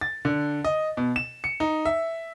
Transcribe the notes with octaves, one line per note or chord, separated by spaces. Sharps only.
A6
D3
D#5
B2
E7
C#7
D#4
E5